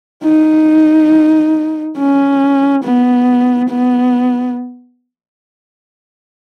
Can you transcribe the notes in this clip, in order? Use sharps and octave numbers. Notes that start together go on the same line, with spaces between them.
D#4
C#4
B3
B3